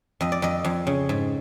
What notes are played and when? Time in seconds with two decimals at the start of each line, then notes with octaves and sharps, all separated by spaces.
0.21 F2 D#5
0.32 D5
0.42 F2 D#5
0.64 F2
0.87 C#3
1.09 G#2